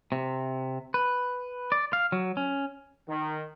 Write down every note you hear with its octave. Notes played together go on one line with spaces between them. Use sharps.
C3
B4
D5
F5
F#3
C#4
D#3